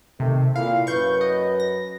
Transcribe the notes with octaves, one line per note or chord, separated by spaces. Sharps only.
C3 D#3 A3
A#2 E4 F5
F#2 B4 C#6 G6
D#5
A#6